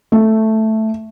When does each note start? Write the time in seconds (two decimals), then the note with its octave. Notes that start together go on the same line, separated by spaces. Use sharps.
0.12 A3